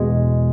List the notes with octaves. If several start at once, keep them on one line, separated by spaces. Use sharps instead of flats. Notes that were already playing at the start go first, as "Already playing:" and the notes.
Already playing: E2 B2 G#3